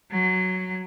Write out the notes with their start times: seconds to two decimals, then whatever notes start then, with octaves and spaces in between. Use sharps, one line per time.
0.11 F#3